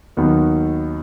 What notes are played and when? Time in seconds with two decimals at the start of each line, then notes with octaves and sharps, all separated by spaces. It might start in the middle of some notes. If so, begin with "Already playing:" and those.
0.17 D#2 D#3 F#3 B3